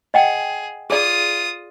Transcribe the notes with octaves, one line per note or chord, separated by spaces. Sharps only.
G#4 D#5 F#5 G5
F4 G#4 A4 D5 D#6